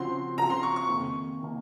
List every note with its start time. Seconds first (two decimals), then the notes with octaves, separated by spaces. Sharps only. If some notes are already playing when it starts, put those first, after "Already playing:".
Already playing: C#3 F3 C4 F#4 C6
0.37 C#3 F3 C4 F#4 A#5
0.50 C6
0.63 C#6
0.76 C#6
0.89 F2 C3 D#3 A#3
1.41 C3 D#3 A#3